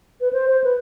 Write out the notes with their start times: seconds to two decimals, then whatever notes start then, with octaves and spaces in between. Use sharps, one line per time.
0.21 B4
0.33 C5
0.49 C5
0.64 B4